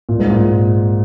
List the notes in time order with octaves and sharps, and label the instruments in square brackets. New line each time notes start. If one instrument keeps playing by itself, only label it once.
[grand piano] A#2
G#2
A#2